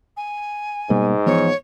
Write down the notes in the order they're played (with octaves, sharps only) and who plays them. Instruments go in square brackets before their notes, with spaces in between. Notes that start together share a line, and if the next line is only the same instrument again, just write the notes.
[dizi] G#5
[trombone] G#2 [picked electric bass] B2 G3 A#3
[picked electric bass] E3 F3 B3 [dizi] C#5